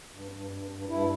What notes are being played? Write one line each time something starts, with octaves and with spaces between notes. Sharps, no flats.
G2
G2
G2
G2
G2 E4